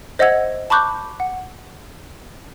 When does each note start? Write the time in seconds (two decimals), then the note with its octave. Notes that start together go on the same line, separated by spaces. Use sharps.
0.19 C5 D#5 E5 F#5 E6 G#6
0.70 A5 B5 C#6 D6 F#6 G6
1.20 F#5